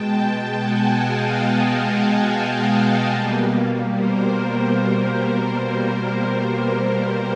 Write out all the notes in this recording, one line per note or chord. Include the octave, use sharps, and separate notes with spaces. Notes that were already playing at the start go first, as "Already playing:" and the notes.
Already playing: B2 G#3 G5 A5
G5 A5
F#5 G#5
D#5 F5
D#5 F5
B2 G3 A#3
A#4 C5